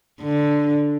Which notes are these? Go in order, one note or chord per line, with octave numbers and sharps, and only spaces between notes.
D3